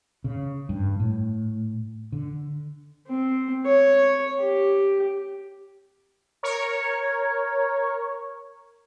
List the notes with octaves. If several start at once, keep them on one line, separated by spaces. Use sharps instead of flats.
C#3
G2
A2
D3
C4
C#5
G4
A#4 C#5